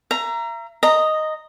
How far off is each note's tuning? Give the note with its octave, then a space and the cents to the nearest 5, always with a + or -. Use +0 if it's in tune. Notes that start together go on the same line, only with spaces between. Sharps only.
E5 +40 A#5 +0
D#5 +0 A#5 -10